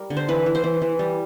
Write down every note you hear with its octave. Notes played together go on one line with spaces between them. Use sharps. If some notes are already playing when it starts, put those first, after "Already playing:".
Already playing: G3 A#4
D3
C5
E3 B4
E3
C5
E3
E3
G3